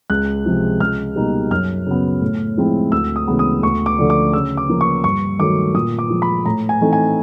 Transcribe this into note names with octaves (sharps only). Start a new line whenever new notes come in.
C#2 F#6
C3 F3 G#3
C#2 F6
B2 G3 A#3 D#4
F#2 F6
C#3 F#3 B3
A2
F3 G#3 C4 E4
D2 E6
D#6
C#3 E3 G#3 B3
D#6
D2 C#6
D6
D3 F3 A3 D4
D6
C#3 E6
D6
F3 A#3
C#6
G2 C#6
D#3 F#3 A3 D6
A#2 D#6
D6
F3 G#3
B5
A2 A#5
G#5
E3 A3 C4 D#4
G#5